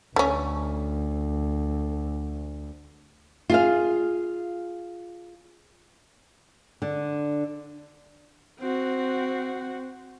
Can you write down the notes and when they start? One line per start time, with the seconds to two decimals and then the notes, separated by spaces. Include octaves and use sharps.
0.16 D2 A3 C#4
3.50 F4 G#4 F5
6.82 D3
8.59 C4 F#4